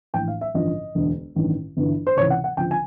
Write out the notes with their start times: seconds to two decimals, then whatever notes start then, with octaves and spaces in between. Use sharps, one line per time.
0.13 A#1 A2 E3 G5
0.28 F5
0.41 E5
0.54 A1 G2 D3 F3 D#5
0.95 E1 D2 D3
1.36 A1 G2 D#3
1.77 G1 G2 E3
2.07 C5
2.17 C#2 C3 E3 C#5
2.30 F#5
2.44 F#5
2.57 D2 C#3 F3 G5
2.71 G#5